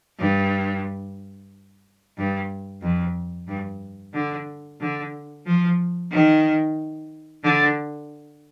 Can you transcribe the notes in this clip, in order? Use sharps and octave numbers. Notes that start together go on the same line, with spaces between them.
G2
G2
F2
G2
D3
D3
F3
D#3
D3